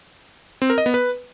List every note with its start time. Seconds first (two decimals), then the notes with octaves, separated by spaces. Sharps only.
0.62 C4
0.70 A#4
0.78 D#5
0.86 B3
0.94 B4